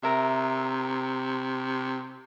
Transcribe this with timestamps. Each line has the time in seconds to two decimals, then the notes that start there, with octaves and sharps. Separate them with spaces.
0.03 C3 A#4 E5